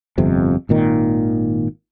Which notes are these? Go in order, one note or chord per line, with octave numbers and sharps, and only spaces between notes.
G1 F2 C3
G#1 A#2 D#3